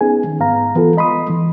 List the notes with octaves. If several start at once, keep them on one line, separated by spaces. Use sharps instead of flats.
B3 C#4 D#4 G#4 G#5
D#3
G#2 B3 F5 A#5
E3 B3 F4 A4
D#5 B5 C6 D#6
E3